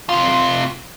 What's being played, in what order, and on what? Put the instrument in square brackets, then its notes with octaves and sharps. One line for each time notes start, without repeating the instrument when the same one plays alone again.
[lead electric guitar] C3 F4